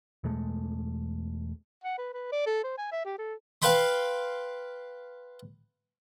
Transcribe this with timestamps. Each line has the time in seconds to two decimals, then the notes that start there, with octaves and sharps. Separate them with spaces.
0.24 E2 B2 G#3 A3
1.84 F#5
1.98 B4
2.13 B4
2.32 D5
2.46 A4
2.64 C5
2.78 G#5
2.92 E5
3.05 G4
3.18 A4
3.62 B4 F5 G5 B5 C6